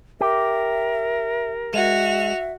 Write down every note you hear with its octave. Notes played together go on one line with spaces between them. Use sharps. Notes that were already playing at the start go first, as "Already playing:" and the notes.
G4 A#4 E5
G#3 F#4 E5 F7